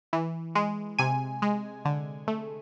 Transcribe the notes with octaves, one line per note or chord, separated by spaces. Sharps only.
E3
G#3
C3 G#5
G#3
D3
A3